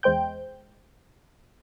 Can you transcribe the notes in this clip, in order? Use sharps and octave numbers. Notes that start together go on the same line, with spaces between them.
E2 G#3 C5 G5 G6